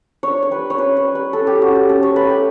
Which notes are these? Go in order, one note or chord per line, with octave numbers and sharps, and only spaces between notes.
D4 C#5
C#5
G3 B4
C#5
C#4 B4
C#5
G3
B4
C#4 A4
G4
C#4 F#4
G4
C#4 A4
C#5
A3 B4
G4